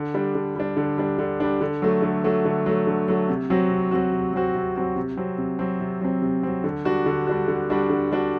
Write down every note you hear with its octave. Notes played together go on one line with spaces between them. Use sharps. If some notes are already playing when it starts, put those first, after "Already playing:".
Already playing: D3
G3 D4
D3
G3 D4
D3
G3 D4
D3
G3 D4
D3
F#3 A3
D3
F#3 A3
D3
F#3 A3
D3
F#3 A3
C3
F#3 C4 F#4
C3
F#3 C4 F#4
C3
F#3 C4 F#4
C3
F#3 C4 F#4
C3
F#3 C4
C3
F#3 C4
C3
F#3 C4
C3
F#3 C4
D3
G3 D4 F#4
D3
G3 D4 F#4
D3
G3 D4 F#4
D3
G3 D4 F#4